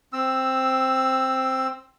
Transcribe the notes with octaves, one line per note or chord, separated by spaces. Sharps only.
C4 E6